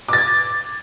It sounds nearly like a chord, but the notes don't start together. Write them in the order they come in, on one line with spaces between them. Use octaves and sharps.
D6 A6 G#6